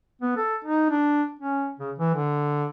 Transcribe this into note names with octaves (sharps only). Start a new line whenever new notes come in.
B3
A4
D#4
D4
C#4
C#3
E3
D3